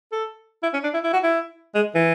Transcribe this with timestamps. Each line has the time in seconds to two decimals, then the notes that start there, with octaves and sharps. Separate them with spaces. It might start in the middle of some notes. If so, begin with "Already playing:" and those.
0.12 A4
0.63 E4
0.74 C#4
0.84 D4
0.94 E4
1.04 E4
1.13 F#4
1.24 E4
1.75 G#3
1.95 E3